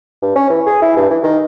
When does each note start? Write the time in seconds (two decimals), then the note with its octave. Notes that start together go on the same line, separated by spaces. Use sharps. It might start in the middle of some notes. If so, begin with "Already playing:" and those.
0.22 G2
0.35 C#4
0.50 E3
0.66 G#4
0.82 E4
0.96 G2
1.10 E3
1.23 D#3